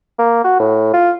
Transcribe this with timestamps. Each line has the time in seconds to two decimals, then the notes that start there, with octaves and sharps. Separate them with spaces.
0.19 A#3
0.45 F#4
0.59 A2
0.93 F4